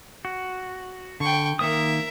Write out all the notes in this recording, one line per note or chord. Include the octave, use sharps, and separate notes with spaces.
F#4
D3 G5 C#6
D#3 A#3 A#4 E5 D#6